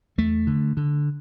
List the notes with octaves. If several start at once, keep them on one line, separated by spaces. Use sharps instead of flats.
E2 A3
D3
D3